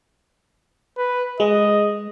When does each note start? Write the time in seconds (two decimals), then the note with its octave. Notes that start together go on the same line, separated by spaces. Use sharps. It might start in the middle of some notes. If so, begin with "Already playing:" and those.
0.97 B4
1.40 G#3 D#5